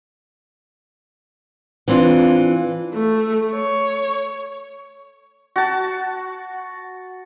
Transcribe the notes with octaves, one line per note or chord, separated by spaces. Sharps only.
E3 C4 D4 F4
A3
C#5
F#4 A5